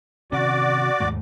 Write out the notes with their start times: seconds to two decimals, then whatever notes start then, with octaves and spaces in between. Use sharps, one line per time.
0.32 C3 D#3 C#4 F#4 D5 D6
1.00 D#2 G#2 A3